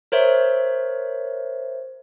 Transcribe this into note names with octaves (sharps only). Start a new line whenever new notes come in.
A#4 C5 C#5 E5